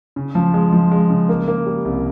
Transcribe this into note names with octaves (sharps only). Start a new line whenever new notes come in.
C#3
F3
G#3
F3
G#3
C#3
A#3
A#3
G3
C2